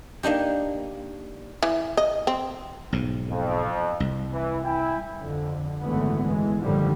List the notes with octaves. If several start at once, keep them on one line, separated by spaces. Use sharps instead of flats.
A#3 D4 D#4 G4
E3
D#5
C4
B1 G#2
F2
C2
E3
E4 G5 G#5
F2 D3
G#1 F#2 D3 E3 A3 B3
E3 G#3
F#2 A2 D3 D#3 F3 G3